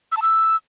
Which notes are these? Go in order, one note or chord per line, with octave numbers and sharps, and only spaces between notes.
E6
A5
E6